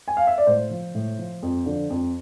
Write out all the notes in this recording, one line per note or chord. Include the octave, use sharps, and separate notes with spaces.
G#5
F5
E5
D5
A2 C5
F3
A2
F3
F2
D3 F3
F2